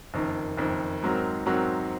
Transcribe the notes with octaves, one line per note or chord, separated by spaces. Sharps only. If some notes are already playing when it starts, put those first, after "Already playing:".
F#1 F2 D#3
F#1 F2 D#3
G#2 F#3 C4 F#4 A#4
G#2 F#3 C4 F#4 A#4